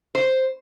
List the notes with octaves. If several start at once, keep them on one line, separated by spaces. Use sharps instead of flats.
C5